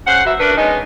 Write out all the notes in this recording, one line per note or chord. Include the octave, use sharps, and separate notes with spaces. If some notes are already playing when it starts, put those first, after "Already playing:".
C#3 C5 F#5
F#3 B4 E5
D4 F#4 A#4 B4
G#3 B3 C#4 D#4